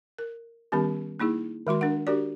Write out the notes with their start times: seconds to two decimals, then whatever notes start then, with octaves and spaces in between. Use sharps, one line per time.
0.19 A#4
0.72 D#3 G3 B3 C#4 G4
1.20 A#3 D#4 E4 G#4
1.67 D#3 G#3 F#4 C6
1.81 D4 A#4 F#5
2.07 D4 F#4 G4 A#4 D5